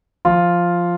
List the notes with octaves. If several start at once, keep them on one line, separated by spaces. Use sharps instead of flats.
F3 F4